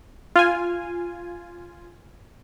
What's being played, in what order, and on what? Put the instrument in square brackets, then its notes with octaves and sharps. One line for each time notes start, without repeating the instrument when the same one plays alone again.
[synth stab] F4 G#5